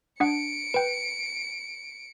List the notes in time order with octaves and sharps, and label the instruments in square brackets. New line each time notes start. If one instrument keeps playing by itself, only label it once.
[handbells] D4 F#5 [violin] C#7 D7
[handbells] B4 G5